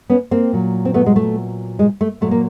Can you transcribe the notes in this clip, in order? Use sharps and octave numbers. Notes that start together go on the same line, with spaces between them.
B3 C#4
A#3 C4
A#2 F#3
C4
A3 B3
G#3
A3
G#3
A3
A#2 F#3 A3
A#3